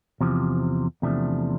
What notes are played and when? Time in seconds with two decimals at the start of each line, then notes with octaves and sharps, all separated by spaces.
0.21 E2 C3 F3
1.02 E2 C3 F3 A3 D4